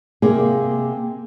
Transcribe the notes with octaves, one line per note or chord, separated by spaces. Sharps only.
C3 A#3 G#4